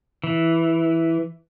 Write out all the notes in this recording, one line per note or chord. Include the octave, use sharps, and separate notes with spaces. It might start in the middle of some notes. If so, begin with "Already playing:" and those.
E3